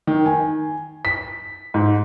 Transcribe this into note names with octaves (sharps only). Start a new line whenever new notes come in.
D#3
G#5
B6
G#2